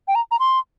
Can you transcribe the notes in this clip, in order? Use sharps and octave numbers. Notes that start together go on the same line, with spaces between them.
G5
A#5
A#5
C6